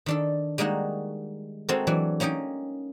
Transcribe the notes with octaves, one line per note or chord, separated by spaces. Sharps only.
D#3 D4 A4
G3 G#3 A#3 D#4 F#4
G#3 C4 F#4 A4 A#4
E3 F#3 D4
A#3 C#4 D#4 D#5 G5